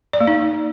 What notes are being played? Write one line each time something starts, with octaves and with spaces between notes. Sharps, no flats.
D5
A#3
D#4